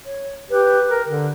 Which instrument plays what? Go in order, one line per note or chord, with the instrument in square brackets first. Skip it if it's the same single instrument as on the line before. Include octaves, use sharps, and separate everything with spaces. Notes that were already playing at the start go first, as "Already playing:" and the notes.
[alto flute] C#5
[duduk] G4 [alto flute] B4
[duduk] A#4
D3